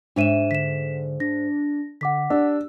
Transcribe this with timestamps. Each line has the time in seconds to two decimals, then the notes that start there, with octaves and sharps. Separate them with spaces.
0.16 G#2 D4 C#5 E5 D#7 E7
0.51 D3 B6 E7
1.20 D4 A#6
2.01 D3 F#5 D6 B6
2.30 D4 G4 E6